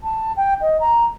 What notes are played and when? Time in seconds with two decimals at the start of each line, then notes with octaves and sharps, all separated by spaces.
0.03 A5
0.36 G5
0.61 D#5
0.80 A#5